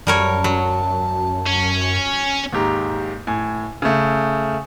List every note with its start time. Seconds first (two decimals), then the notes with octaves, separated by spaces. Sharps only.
0.07 F#2 G3 A#4 C#5 A5
0.44 F#3
1.46 C#4
2.53 D#2 G#2 G4 A#5
3.27 A2 G#5
3.82 C#3 A3